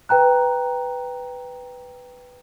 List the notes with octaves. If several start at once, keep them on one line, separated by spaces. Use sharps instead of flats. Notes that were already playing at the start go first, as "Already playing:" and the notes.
B4 G5 A#5 F#6